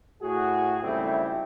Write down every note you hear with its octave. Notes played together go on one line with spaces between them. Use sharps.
A2 F#4 G#4
G#1 C#3 G3 A3 C4 E4